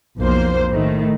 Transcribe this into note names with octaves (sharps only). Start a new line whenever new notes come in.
B1 F2 A#3 C5
A2 D#3 A3